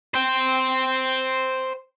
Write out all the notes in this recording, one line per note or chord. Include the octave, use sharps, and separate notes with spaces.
C5 G5